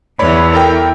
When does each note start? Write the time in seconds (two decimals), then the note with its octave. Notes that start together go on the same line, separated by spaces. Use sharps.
0.19 E2 E3 C#5 D5 B5
0.53 A4 A#4 G5